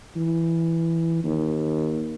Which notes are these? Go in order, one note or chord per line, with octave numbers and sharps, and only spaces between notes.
E3
D#2